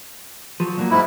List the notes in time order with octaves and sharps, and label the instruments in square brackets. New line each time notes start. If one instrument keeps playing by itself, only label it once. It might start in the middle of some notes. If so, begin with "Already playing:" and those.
[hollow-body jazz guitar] F3 F#3
A#2 F#3 A#3
[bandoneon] G#2 E4